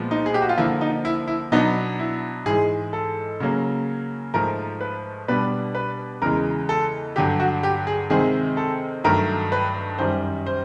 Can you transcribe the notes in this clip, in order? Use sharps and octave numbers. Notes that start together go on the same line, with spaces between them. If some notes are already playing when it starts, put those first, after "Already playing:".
Already playing: A#2 F3 G#3 B3
D#4
G#4
G4
F#4
F4
D3 F3 A#3 E4
D#4
E4
E4
B2 F#3 B3 D4 D#4
E4
G#2 E3 G#3 G#4
A4
C#3 F#3 A#3 C#4
G#2 F3 A3 A#4
B4
B2 G3 B3 D4 B4
B4
E2 C#3 E3 G#3 A#4
A4
G2 D3 F#3 G4
F#4
G4
G#4
C3 D#3 G#3 C4 G#4
A4
G2 D#3 F#3 A3 A#4
B4
F#2 D#3 G3 C5
C5